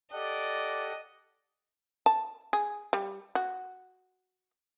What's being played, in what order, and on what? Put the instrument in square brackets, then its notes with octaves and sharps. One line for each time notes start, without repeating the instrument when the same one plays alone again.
[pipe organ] G4 A4 F#5 [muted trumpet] D5 [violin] D#5
[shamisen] A5
G#4
G3
F#4